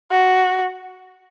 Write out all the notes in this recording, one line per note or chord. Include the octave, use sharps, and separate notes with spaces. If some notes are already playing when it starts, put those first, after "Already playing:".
F#4